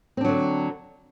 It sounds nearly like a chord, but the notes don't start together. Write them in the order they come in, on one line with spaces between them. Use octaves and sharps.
C4 D4 F#3 D3